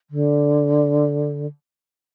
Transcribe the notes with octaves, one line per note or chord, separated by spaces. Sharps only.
D3